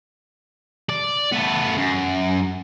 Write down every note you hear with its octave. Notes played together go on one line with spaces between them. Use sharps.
D5
A3 B3
F#2